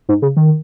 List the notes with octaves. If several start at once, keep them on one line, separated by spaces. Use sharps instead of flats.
G#2
C#3
D#3